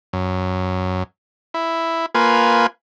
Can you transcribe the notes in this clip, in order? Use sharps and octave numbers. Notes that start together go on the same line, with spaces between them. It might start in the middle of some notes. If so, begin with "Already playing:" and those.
F#2
E4
A#3 F4 B4 G#5